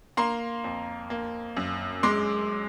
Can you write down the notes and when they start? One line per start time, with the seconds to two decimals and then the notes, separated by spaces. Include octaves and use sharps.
0.17 A#3 A#5 C6
0.64 F2
1.10 A#3
1.57 F#2
2.03 G#3 C6 D6